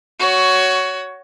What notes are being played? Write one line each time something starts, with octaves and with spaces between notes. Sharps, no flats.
F#4 C#5